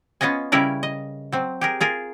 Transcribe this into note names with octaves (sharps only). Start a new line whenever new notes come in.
B3 C#4 F4 D#5 G#5
C#3 G3 C#4 E4 A#4 B4
D#5
F#3 C4
G4 G#4 A#4
F4 G#4 A#4